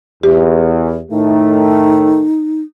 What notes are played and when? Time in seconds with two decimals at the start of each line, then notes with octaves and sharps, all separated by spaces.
0.23 E2 G4
1.12 A2 D#3 A3 D#4